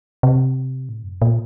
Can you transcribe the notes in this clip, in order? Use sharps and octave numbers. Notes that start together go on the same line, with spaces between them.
C3
A2
F#2
A#2